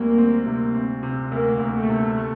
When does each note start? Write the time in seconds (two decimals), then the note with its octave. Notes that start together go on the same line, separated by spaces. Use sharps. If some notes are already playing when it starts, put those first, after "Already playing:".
Already playing: D2 G3 A#3 C4
0.18 C4
0.46 C3
0.75 C4
1.03 C3
1.32 D2 A#3
1.59 D2
1.74 A3
1.89 C3
2.18 A3